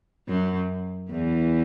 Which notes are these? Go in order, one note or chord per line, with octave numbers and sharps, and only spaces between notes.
F#2 F#3
E2 E3